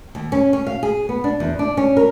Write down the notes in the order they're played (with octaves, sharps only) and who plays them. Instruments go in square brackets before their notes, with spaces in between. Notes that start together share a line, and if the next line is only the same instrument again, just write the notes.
[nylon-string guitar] D#2
C#4
C#4
F5
G#4
B3
D4
E2
D4
C#4
A#4